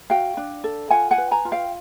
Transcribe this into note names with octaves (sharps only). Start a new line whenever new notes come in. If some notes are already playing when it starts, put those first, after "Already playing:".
F#4 F5 G5
D4
A4
F4 F#5 G#5
F#5 G#5
B4
G#5 A#5
F4
F5 G5